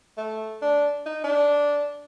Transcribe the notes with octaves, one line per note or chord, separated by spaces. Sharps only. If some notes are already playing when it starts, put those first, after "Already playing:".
A3
D4
D#4
D4